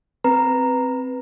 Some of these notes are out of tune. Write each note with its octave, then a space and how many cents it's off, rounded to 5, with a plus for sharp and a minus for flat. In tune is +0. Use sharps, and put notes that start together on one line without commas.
C4 +0 B4 +0 A#5 -5